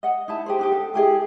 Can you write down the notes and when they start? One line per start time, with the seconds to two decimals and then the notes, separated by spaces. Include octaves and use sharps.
0.03 D#5 F#5
0.28 D#4 E4 A5
0.46 G4 G#4 C5
0.59 D4 D#4 G4
0.72 A4
0.94 E4 G4 G#4 D#5